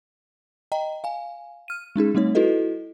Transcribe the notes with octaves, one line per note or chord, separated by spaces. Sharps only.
D#5 G5 A#5
F5 G#5
F6 D#7
G#3 C#4 D#4 G#4
G3 A3 C4 D#4 C#5
E4 F#4 A4 B4 D#5